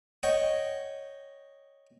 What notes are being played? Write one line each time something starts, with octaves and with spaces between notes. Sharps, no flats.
C#5 D#5 F#5 G5